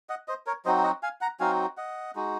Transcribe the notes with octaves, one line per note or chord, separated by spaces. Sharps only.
D#5 F#5
C5 D#5
A#4 C#5
F#3 C4 D#4 F#4 C5 D#5
D#5 F#5
F5 G#5
F#5 A#5
F#3 C4 D#4 F#4 F5 G#5
D#5 F#5
G#3 D#4 F#4